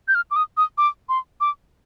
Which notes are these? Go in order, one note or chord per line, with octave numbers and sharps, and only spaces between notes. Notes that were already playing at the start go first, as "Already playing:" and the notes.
G6
F6
D6
D#6
D#6
D6
C6
D6